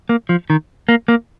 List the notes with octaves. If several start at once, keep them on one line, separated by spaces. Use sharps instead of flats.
A#3
F3
D#3
A#3
A#3